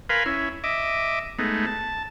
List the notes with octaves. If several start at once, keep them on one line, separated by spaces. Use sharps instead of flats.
A#4 B4 F5 G#5 B5 C6
C#4 E4
D#5 E5 D6
G#3 A3 B3 D#4
A5